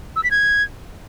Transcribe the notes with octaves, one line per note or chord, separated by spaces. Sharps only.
E6
B6
G#6